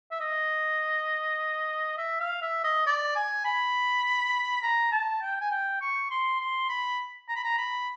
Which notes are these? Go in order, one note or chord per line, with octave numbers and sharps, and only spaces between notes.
E5
D#5
E5
F5
E5
D#5
D5
G#5
B5
A#5
A5
G5
G#5
G5
C#6
C6
C6
B5
A#5
B5
A#5
B5